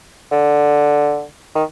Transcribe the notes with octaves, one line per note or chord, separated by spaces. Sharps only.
D3
D#3